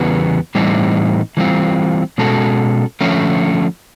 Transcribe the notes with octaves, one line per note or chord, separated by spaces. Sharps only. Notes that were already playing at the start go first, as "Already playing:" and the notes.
Already playing: E2 C#3 E3 G3 B3
A2 E3 G3 C4 D#4
E3 G3 C4 F4
B2 G#3 C#4 F#4 A4
D3 F3 A3 C#4